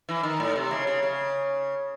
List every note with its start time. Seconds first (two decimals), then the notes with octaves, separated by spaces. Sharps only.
0.09 E3
0.23 D#3
0.40 A2
0.56 C3
0.71 C#3
0.87 C#3
1.03 C#3